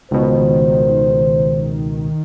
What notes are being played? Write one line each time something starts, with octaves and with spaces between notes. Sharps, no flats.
C#2 B2 D#3 C5